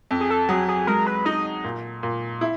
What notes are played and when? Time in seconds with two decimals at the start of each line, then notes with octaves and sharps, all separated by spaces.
0.11 F2
0.20 G#4
0.30 A4
0.49 F#3 G#4
0.68 G#4
0.87 G#3 A#4
1.07 B4
1.25 D#4 D#5
1.64 A#2
2.03 A#2
2.41 E4